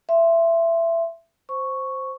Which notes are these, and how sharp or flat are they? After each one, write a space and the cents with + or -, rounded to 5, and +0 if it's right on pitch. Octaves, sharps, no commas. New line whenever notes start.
E5 +20 C6 +0
C5 +0 C#6 +0